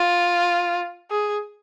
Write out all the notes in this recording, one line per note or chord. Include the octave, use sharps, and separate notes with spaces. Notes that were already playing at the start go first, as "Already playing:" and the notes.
Already playing: F4
G#4